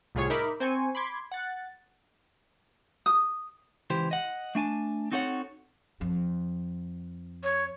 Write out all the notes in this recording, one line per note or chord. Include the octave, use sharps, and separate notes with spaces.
C2 A2 F4 G#4 C#5 C#6
D#4 A#4 E5 B5 D6
C4 C5 G#5 C#6
B5 C6 D6 G#6
F#5 A6
D#6
C#2 E3 G4 C5
D#5 F#5
A3 D4 G#5 A5
C4 D#4 F#4 A4 C#5 F#5
F2
C#5